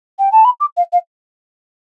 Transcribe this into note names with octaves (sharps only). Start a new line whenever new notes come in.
G5
A5
B5
D6
F5
F5